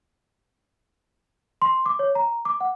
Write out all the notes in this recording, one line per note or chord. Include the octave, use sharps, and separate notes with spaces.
C6
D6
C#5
A#5
D6
F#5